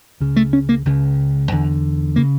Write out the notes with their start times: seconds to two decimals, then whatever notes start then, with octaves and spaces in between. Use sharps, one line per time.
0.20 C#2 C#3
0.36 A3
0.53 C#4
0.69 A#3
0.85 C#2 C#3
1.51 E2 D3
2.16 C#3 A#3